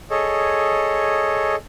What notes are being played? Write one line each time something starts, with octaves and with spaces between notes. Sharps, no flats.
G#4 A4 C#5 D#5